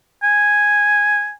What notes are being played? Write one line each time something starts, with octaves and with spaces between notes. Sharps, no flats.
G#5